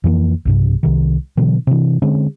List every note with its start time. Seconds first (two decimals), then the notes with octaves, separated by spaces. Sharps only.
0.04 F2 E3 A#3
0.45 B1 G2 C3
0.83 C2 C3 D#3
1.37 B2 D3 E3 F#3
1.67 C3 E3
2.02 D3 G#3 C4 C#4